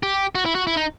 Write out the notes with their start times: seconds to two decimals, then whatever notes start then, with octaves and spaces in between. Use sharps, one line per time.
0.03 G4
0.35 F#4
0.45 E4
0.55 F#4
0.67 E4
0.77 D#4